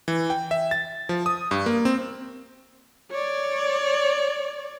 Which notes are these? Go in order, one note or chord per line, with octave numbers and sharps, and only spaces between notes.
E3
G5
E5
A6
F3
D#6
G2
A#3
C4
C#5 D5